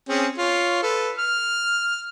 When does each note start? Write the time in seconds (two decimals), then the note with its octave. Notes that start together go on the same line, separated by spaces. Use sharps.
0.09 C4 C#4 G#4
0.38 F4 C#5
0.83 A4 B4
1.18 F6